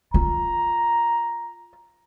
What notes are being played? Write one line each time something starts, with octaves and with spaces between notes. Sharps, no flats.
F4 A#5